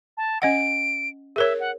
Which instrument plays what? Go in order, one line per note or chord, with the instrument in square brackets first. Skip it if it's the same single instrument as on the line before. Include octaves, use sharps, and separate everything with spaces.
[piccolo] A5
[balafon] C#4 D#5 F#5 [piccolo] D7
[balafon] G#4 A#4 C#5 [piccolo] E5
[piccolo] F#5